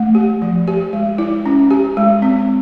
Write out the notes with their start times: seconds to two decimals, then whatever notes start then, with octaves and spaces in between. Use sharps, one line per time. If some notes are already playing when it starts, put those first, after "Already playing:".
Already playing: A3
0.15 G4
0.42 F3
0.68 G4
0.93 G#3
1.18 E4
1.46 C#4
1.71 G4
1.97 G#3
2.22 C4